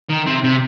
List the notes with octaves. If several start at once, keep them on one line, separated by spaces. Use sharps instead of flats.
D#3
C3
C3